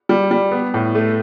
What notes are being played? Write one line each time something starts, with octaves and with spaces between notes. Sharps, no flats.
G3
G3
B3
A2
A3